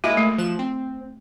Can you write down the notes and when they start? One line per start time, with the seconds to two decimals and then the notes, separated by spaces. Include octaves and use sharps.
0.04 G#3 A#3 E4 F#4
0.17 A3
0.38 F3 F#6 E7
0.59 C4